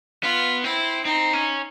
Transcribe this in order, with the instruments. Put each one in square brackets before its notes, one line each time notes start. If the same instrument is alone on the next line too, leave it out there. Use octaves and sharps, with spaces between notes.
[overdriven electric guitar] B3 [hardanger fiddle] F4
[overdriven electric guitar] C4 [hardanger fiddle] E4
[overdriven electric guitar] C4 [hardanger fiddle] D#4
[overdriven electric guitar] C#4